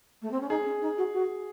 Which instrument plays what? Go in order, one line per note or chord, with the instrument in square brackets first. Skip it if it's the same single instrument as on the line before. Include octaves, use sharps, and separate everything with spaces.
[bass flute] A3
C4
C#4
[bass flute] D#4 [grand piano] G#4
[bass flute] C#4
D#4
F#4
F#4